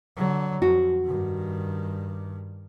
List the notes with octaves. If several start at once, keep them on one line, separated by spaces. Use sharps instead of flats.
D3 F#3
F2 F#4
G2 D#3